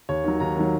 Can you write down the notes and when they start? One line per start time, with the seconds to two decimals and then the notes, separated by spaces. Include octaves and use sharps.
0.09 D#2 C#5
0.24 D#3 F#3
0.40 D#2 A#5
0.57 D#3 F#3